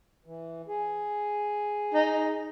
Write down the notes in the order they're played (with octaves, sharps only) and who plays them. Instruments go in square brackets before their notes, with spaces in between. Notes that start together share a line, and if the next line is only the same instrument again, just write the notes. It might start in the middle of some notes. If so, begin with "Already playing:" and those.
[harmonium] E3
G#4
[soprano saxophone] D#4